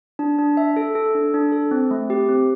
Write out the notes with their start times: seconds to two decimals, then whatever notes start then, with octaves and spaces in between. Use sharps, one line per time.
0.19 D4
0.39 D4
0.57 E5
0.77 A4
0.95 A4
1.15 D4
1.34 D4
1.52 A4
1.71 C4
1.91 A3
2.10 G4
2.29 C4